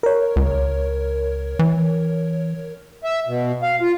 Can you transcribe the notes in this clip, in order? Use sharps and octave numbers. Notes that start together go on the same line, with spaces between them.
A#4 C#5
C#2
E3
E5
B2
F5
F4